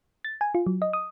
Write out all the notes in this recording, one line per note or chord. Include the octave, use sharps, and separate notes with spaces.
A6
G#5
F4
F#3
D#5
D#6